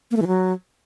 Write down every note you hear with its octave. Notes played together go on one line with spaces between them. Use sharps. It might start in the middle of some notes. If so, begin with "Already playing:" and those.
A#3
A3
E3
F#3